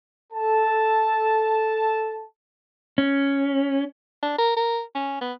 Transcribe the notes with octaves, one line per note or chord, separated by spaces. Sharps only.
A4 A5
C#4
D4
A#4
A#4
C#4
B3